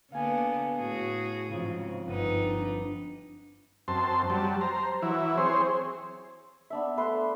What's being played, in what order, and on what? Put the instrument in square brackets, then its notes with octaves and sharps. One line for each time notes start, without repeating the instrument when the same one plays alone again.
[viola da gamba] D3 A#3 B3 [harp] F5 G#5
[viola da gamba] A2 F#4 G#4
[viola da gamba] G#2 C#3 [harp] F3 C4 F4
[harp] G1 D#7 [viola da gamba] D#4 B4
[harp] D4
[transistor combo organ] F#2 C4 A5 C6
F#3 G3 A5
C5 A#5
E3 F#3 E4
C4 G#4 C5 C#5
[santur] B3 D4 E5
A3 B4 E5 C6